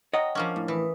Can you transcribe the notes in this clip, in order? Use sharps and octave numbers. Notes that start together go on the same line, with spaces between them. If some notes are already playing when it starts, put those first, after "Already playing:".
C#5 D#5 F#5 G5 A#5
F3 A#3 C#4 D4 F5
A2
E3 B4 D#6